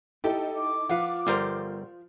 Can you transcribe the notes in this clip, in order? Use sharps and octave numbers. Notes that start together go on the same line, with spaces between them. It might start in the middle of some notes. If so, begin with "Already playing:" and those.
D#4 E4 G4 A4
D6
F3 B4 F5 F#5
G1 G3 F4 A#4 C5